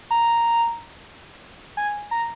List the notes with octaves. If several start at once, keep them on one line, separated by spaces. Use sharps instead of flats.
A#5
G#5
A#5